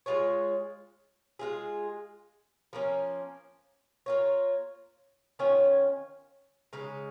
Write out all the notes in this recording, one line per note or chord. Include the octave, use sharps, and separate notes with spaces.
G#3 F4 G#4 C#5
G#3 F4 G#4
F3 A#3 C#4
A#3 F4 C#5
D#3 C#4 F4 C#5
C#3 G#3 D#4